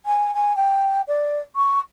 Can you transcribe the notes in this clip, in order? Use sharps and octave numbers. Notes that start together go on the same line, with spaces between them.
G#5
G#5
G5
D5
C#6